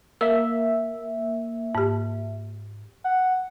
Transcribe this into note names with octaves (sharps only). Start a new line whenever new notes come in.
A#3 E5 E6
G#2 G4
F#5